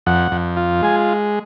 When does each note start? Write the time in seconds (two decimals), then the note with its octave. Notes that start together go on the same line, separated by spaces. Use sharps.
0.06 F2 F#5
0.32 F2
0.57 F4
0.82 G#3 G#5